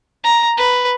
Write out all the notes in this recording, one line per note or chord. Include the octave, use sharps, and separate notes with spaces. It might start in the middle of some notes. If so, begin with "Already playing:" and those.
A#5
B4